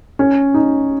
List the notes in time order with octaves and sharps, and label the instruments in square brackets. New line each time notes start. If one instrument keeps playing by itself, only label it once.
[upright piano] C#4
D#4